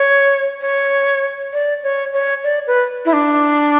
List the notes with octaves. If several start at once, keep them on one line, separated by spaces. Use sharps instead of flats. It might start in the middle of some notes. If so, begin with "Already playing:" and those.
Already playing: C#5
C#5
D5
C#5
C#5
D5
B4
E4
D4